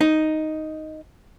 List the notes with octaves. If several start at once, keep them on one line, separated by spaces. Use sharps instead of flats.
D#4